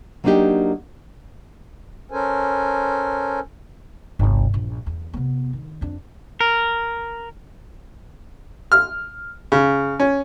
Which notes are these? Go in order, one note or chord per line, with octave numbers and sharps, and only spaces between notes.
F#3 A#3 B3 D4 D#4 G4
C#4 A4 A#4 C5 G#5
G1 C2
A#1
E2
C3 B3
D#3
F2 D4
A#4
F6
C#3
C#4